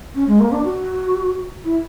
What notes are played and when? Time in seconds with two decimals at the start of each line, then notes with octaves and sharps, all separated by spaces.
0.15 C#4
0.28 G#3
0.40 A#3
0.52 D4
0.65 F#4
1.65 E4